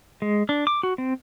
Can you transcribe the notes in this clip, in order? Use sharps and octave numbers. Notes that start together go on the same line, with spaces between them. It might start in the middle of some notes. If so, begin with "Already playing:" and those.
G#3
D4
D6
F#4
C4